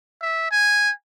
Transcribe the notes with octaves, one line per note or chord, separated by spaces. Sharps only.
E5
G#5